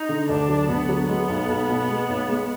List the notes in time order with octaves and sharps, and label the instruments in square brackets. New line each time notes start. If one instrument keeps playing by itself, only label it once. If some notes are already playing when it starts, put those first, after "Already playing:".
Already playing: [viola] D#4
[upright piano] D3
[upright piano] D2 [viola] D4
[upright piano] F#3
[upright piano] D2 [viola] B3
[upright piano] F#3
[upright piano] G#3 [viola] B3
[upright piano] B1
B1
B2
G#3
B1
G#3